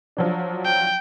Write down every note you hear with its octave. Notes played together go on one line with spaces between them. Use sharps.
F3 F#3 D4
G5